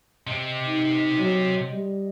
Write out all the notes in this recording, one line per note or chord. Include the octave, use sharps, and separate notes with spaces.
C3 C4 D#5
D#4
F#3
G3